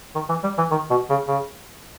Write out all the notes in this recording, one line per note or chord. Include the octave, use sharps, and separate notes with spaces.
D#3
E3
G3
E3
D#3
B2
C#3
C#3